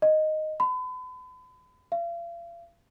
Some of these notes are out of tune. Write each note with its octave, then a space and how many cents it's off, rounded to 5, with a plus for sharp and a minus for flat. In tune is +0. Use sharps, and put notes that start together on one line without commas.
D#5 -5
B5 +40
F5 -40